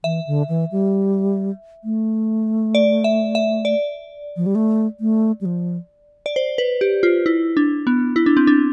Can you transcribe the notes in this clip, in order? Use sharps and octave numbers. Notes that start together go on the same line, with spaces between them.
E3 E5
D3
E3
G3
A3
D5
E5
E5
D5
F3
G3
A3
A3
G3
F3
D5
C5
B4
G4
F4
E4
D4
B3
E4
D4
C4
D4